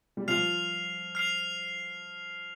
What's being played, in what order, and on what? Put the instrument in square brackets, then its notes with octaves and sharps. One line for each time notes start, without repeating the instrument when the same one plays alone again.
[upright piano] G3
[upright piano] F3 [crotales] F6 C7 F7
[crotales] F6 C7 F7